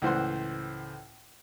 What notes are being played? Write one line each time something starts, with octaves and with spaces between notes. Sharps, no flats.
C#2 A2 E3 C5 F#5 C6